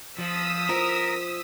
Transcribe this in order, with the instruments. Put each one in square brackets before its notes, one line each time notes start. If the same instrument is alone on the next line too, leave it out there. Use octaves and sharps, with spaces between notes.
[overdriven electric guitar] F3 [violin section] D#6 E6 B6
[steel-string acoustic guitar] F3 [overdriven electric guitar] A#4